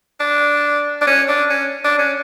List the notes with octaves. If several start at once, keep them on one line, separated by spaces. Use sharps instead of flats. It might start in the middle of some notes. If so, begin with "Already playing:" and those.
D4
D4
C#4
D4
C#4
D4
C#4